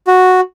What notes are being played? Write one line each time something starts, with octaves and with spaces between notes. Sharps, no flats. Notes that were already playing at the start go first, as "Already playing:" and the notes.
F#4